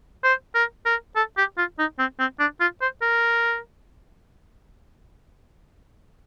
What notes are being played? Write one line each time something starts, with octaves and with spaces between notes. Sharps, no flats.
C5
A#4
A#4
A4
G4
F4
D#4
C4
C4
D4
F4
C5
A#4